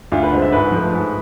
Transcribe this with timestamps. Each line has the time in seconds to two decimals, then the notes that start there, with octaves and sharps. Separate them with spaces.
0.12 D2 F4
0.22 B4
0.32 D3 G#3 C5
0.42 E5
0.52 G#2 B4
0.72 F3 A3
0.93 G#2